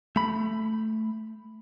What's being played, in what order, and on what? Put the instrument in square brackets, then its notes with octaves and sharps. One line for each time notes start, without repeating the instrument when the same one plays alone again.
[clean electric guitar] A3 B5